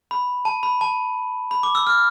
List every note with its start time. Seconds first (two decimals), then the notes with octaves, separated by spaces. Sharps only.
0.11 B5
0.45 A5
0.63 B5
0.81 A5
1.51 B5
1.63 D6
1.75 E6
1.87 F6